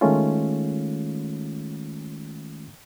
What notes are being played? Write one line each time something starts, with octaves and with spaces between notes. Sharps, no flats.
D#3 G#3 A3 C#4 F4